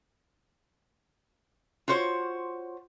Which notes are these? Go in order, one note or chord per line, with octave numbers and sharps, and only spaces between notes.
F4 F#4 C5 C#5